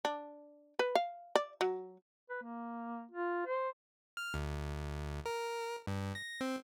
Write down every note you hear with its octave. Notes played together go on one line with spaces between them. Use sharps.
D4
B4
F5
D5
F#3
B4
A#3
F4
C5
F6
D2
A#4
G2
A#6
C4